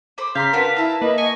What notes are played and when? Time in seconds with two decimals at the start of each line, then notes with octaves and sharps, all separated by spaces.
0.18 C5 B5 D6
0.35 C#3 F5 A#5 C6 G6 B6
0.53 D4 F4 F#4 A#4 B4
0.77 E4 E5 A5
1.01 A#3 B4 D#5
1.18 G#5 C#6